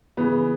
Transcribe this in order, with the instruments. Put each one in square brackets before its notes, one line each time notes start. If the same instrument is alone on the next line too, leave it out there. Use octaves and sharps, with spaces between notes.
[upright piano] C#3 E3 B3